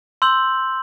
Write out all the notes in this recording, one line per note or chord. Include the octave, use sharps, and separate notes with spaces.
C6 E6 G6 F#7